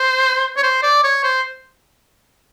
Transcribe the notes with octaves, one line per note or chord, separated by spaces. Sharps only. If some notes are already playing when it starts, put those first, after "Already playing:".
Already playing: C5
C#5
C5
D5
C#5
C5